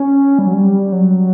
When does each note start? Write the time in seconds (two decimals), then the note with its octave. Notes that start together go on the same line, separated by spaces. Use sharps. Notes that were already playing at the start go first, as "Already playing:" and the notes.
Already playing: C#4
0.39 G3
0.47 F#3
0.53 G3
0.92 F#3